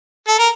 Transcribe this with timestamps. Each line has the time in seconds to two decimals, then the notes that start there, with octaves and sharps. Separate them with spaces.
0.28 A4
0.39 A#4